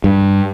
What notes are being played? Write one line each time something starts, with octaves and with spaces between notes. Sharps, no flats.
G2